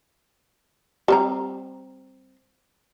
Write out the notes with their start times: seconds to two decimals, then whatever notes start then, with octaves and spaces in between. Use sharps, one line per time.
1.08 G3 C4 A#5